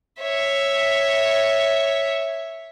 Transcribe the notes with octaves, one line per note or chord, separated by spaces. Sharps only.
C#5 E5